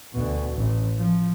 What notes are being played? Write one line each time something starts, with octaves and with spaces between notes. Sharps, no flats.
D2 B2
A1
F3